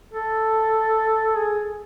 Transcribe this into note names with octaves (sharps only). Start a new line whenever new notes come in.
A4
G#4